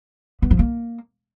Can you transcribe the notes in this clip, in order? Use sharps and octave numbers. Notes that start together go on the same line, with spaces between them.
B3
F3
A#3